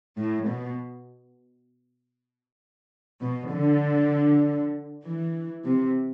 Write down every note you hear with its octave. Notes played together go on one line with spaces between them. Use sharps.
A2
B2
B2
D3
E3
C3